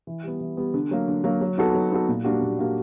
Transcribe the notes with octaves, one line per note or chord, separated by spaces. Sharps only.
E3
G3 B3
E3
G3 B3
D3
F#3 A#3
D3
F#3 A#3
F#3
B3 D#4 F#4 A4
F#3
B3 D#4 F#4 A4
A#2
G3 A#3 D4 F#4
A#2
G3 A#3 D4 F#4